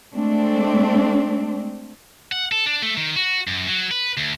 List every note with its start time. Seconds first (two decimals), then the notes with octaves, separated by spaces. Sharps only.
0.14 G#3 A3 C4 D4
2.32 F#5
2.52 A4
2.66 D4
2.82 A3
2.97 D#3
3.16 F#4
3.47 F#2
3.67 F#3
3.91 B4
4.17 D2